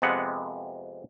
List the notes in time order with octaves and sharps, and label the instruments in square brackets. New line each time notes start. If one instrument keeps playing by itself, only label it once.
[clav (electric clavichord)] F2 C3 G#3 B3 F#5